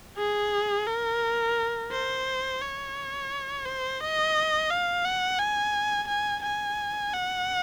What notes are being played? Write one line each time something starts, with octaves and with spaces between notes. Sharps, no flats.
G#4
A#4
C5
C#5
C5
D#5
F5
F#5
G#5
G#5
G#5
F#5